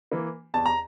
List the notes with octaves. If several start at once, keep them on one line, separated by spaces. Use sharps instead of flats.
E3 A#3
E2 A5
A#5